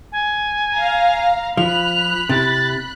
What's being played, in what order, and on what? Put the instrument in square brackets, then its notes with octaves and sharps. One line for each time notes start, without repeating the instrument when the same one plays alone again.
[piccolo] G#5
[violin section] F5 A#5
[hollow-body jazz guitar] F3 [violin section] B5 F#6 [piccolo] F7
[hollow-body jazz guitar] C3 E4 [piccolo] A6